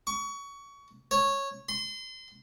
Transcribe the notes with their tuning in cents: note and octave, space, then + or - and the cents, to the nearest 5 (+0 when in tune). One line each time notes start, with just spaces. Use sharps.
C#6 +25
C#5 -10
C6 -30